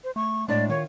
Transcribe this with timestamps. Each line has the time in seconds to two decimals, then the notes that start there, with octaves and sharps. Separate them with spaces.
0.04 C5
0.16 A3 C#6
0.48 A2 G#3 D4 D5
0.70 D#3 F4 C#5